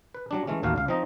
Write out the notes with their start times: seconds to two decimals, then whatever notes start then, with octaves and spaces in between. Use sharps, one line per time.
0.15 B4
0.31 F#3 G3 D4
0.47 E3 G#3 A3 C#4
0.63 A1 D#2 A3 F#4 G4 F5
0.76 C#2 F5
0.88 F3 C4 D#4 D#5